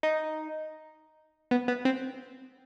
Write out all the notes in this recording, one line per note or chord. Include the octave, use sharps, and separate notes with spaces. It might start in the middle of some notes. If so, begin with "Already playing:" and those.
D#4
B3
B3
C4